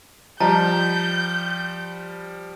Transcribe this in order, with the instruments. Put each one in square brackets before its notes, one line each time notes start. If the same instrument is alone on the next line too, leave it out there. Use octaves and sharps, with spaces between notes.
[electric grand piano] F3 G3 [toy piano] D#5 A5 A#5 [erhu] G6